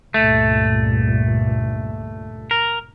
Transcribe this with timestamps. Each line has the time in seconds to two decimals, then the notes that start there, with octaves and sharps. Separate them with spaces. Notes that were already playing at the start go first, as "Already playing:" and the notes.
0.14 C#2 G2 A#2 A3
2.51 A#4